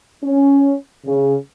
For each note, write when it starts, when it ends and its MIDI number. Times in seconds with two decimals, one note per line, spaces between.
0.24 0.73 61
1.06 1.35 49